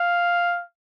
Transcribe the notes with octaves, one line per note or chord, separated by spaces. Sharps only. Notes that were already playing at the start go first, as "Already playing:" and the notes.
Already playing: F5